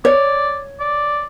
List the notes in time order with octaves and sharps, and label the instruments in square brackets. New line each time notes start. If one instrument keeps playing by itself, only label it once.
[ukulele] C#5 [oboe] D5
[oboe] D5